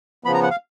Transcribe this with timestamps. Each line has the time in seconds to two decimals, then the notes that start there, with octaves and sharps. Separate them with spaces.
0.24 C#3 F3 B3 B5
0.34 A#5
0.43 F#5
0.50 F5